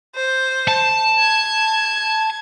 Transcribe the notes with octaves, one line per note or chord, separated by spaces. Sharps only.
C5
A5
G#6